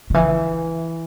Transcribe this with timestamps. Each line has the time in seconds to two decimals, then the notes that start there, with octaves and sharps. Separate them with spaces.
0.10 D3
0.14 E3